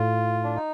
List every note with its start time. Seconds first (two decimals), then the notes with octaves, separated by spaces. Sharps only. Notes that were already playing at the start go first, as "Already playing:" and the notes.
Already playing: A2 F4
0.44 D4
0.55 D#4